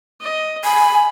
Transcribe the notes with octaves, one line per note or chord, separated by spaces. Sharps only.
D#5
G#5 B5